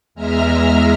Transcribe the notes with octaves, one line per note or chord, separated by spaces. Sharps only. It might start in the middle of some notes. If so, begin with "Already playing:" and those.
E2 G#3 E5 A#5 F6